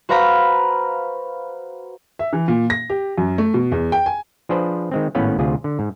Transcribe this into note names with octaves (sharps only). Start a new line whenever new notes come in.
F#4 B4 C5 F5 A#5 B5
E5
E3
A#2
A#6
G4
F#2
A3
B2
E2
G5
G#5
F3 D4 G#4 B4 C5
D#3 G#3 C4
G#1 A2 B3 C#4 B4 F5
D2 C3 F4 G#4
D3
G#2